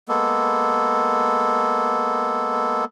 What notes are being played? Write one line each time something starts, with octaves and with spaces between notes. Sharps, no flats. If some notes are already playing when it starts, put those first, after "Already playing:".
G#3 A#3 B3 A4